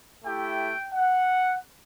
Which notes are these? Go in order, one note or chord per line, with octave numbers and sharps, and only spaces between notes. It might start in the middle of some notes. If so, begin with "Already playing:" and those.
A3 E4 G4 G5
F#5